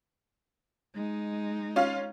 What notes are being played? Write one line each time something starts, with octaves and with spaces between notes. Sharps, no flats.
G#3 D#4
C#4 F4 F5